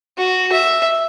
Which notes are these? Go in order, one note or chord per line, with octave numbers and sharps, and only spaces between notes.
F#4
E5